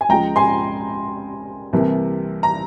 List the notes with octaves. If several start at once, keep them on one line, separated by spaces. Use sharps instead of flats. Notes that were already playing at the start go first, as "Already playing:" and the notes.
G#5
C#2 C#3 F3 G#3 G5 A#5
G#5 C6
C2 C3 E3 A#3
A#5